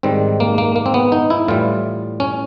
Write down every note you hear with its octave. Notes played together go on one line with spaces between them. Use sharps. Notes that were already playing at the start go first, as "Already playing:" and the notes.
G#2 D#3 G3 C4
A#3
A#3
A#3
C4
B3
D#4
E4
A2 E3 G3 F4
C#4